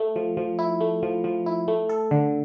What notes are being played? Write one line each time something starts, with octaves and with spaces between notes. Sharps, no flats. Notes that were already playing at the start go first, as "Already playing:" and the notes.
Already playing: A3
F3
F3
E4
A3
F3
F3
E4
A3
A4
D3